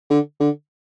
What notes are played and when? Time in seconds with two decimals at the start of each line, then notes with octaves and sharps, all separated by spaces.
0.10 D3
0.40 D3